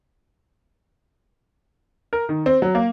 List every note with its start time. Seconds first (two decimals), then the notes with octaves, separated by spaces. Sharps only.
2.13 A#4
2.29 D#3
2.46 C4
2.62 F#3
2.75 A#3